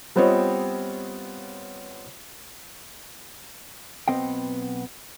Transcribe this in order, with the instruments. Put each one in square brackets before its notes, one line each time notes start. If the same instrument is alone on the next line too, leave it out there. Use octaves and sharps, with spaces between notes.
[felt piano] G3 B3 C4 F4 C#5 D#5
[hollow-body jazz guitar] B1 G#3 B3 C4 D#5 G5